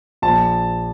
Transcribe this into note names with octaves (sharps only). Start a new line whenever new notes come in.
A#1 A5